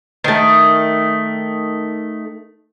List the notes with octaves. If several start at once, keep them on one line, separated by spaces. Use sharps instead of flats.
D#3 A3